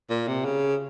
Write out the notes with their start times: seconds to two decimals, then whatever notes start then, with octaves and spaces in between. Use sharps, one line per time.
0.10 A#2
0.28 C3
0.45 C#3